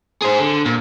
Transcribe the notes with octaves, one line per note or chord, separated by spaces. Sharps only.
G#4 C5
D3
A#2